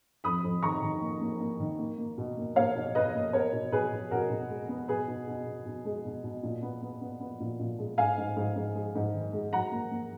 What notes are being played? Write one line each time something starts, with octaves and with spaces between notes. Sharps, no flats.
F2 B5 D#6
F2
D#3 A#5 C#6
D#3
A#3
A#3
A#3
D#3
A#3
A#3
B2
A#3
A#3 C#5 F5
B2
B2 B4 D#5
A#3
B3 A#4 C#5
B2
B2 G#4 B4
B2
B2 F#4 A#4
B2
G#3
B3
B2 G#4 B4
B2
B2
B2
B2
G#3
B2
B2
A#2
B3
B3
B3
B3
A#2
A#2
G#3
G#2 F5 G#5
G#2
G#2
G#2
G#3
G#2
D#3
G#3
F#3 F#5 A#5
A#3
A#3